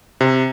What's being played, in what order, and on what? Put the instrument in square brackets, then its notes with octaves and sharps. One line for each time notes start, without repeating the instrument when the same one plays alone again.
[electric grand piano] C3